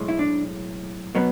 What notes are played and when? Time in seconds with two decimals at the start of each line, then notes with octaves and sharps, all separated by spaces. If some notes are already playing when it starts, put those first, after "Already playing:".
Already playing: B1 A2 G#3
0.08 E4
0.19 D4
1.15 B2 F#3 B3